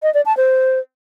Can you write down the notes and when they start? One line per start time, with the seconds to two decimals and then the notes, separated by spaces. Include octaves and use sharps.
0.03 D#5
0.14 D5
0.26 A5
0.37 C5